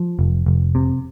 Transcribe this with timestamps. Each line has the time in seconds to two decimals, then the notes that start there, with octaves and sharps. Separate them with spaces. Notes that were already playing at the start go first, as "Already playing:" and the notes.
Already playing: F3
0.19 F1
0.46 F1
0.75 C3